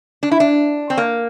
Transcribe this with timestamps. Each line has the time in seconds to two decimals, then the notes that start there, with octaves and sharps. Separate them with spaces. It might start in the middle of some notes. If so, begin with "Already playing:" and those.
0.23 D4
0.31 E4
0.40 D4
0.90 C4
0.97 A#3